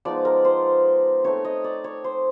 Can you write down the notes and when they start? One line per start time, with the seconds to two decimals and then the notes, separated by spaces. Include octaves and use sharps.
0.05 F3 G#3 B3 D#4 D5
0.25 A#4
0.45 C5
1.24 A3 C4 D#4 C#5
1.45 D#5
1.64 D5
1.84 C#5
2.04 C5